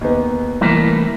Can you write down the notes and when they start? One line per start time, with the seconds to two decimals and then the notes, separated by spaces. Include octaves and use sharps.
0.01 D#2 B3
0.61 C2 E3 A3 A#3